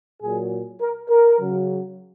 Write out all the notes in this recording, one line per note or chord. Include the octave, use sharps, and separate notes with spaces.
A#2 F#3 G#4
A#4
A#4
C#3 F#3